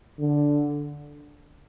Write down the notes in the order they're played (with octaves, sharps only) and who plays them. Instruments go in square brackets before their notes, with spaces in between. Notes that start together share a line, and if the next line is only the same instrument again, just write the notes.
[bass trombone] D3